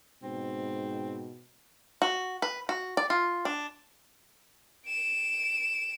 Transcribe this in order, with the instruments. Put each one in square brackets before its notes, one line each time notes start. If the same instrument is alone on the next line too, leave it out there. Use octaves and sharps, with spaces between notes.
[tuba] G#2 [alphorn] B2 [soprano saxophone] C4
[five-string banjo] F#4
B4
F#4
D5
F4
D4
[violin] D7 E7